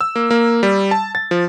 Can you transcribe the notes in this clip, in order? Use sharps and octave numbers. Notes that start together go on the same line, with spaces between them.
E6
A#3
A#3
G3
A5
A6
F3